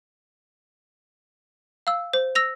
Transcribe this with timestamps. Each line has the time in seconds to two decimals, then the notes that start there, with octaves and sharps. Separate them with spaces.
1.87 F5 E6
2.13 C5
2.35 E6 A#6 F7